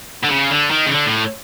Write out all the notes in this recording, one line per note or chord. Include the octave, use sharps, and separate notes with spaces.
D3
C#3
D3
D#3
C#3
D3
A2